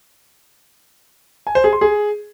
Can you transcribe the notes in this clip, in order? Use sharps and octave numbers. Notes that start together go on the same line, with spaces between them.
G#5
C5
G#4
C6
G#4